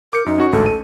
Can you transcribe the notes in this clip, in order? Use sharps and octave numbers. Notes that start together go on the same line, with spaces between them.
A#4 D6 G6 C#7
F#2 D#4
C#4 F#4 C#6
A1 D2 G#2 A4
D#7